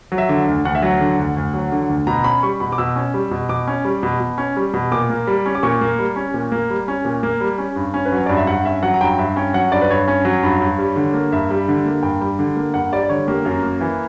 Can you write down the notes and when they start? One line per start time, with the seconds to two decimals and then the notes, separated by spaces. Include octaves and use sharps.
0.12 F#3
0.18 E5
0.29 D3
0.47 D2
0.65 D2 F#5
0.75 E5
0.82 F#3 F#5
1.00 D3
1.18 D2
1.37 D2
1.54 F#3
1.72 D3
1.89 D2
2.07 B2 A#5
2.24 C#4 B5
2.43 G3 C#6
2.60 B2 B5
2.72 D6
2.78 B2 E6
2.96 C#4
3.14 G3
3.31 B2
3.49 B2 D6
3.67 C#4
3.85 G3
4.03 B2
4.20 B2
4.38 C#4
4.56 G3
4.74 B2
4.92 A#2 D6
5.10 A#3
5.27 G3
5.46 C#4
5.55 D6
5.63 A#2 C#6
5.81 A#3
5.99 G3
6.16 C#4
6.34 A#2
6.52 A#3
6.70 G3
6.88 C#4
7.05 A#2
7.23 A#3
7.41 G3
7.58 C#4
7.76 G2
7.94 C#4
8.05 B4
8.12 F#3 C#5
8.26 G2 D5
8.37 E5
8.47 G2 F#5
8.65 C#4 E5
8.83 F#3 F#5
8.94 A#5
9.01 G2 G5
9.18 G2 E5
9.36 C#4 G5
9.54 F#3 F#5
9.72 G2 D5
9.82 B4
9.90 G2 C#5
10.08 C#4
10.25 F#3
10.43 G2
10.61 G2
10.79 G3
10.96 D3
11.14 A#3
11.32 G2 E5
11.50 G3
11.68 D3
11.86 A#3
12.03 G2 G5
12.21 G3
12.39 D3
12.56 A#3
12.74 G2 F#5
12.92 G3 D5
13.03 D5
13.09 D3 C#5
13.28 A#3 G4
13.45 F#2 A#4
13.63 A#3
13.81 E3